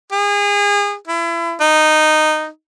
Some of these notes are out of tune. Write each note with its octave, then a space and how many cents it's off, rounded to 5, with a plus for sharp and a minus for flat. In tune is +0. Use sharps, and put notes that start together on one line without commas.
G#4 -30
E4 +35
D#4 -10